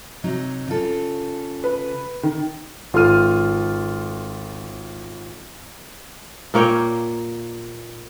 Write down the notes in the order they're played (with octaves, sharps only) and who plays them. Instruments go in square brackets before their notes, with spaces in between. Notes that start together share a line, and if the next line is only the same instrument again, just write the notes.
[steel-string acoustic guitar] C3 F#3 D#4
C#3 F4 A4
[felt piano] B4
D#3
[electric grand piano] G#1 F4 A4 F6 D#7
[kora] A#2 A#3 C#5 G5